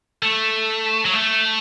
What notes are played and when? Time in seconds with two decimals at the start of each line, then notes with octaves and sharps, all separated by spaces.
0.22 A3
1.05 F#3
1.14 A3